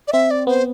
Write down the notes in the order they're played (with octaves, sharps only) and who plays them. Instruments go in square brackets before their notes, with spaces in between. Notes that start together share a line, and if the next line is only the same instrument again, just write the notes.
[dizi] D5
[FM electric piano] C4 [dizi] E5
[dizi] D5
[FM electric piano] B3 [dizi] C5